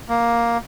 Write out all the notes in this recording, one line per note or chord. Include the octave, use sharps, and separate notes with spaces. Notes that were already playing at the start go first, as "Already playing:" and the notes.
A#3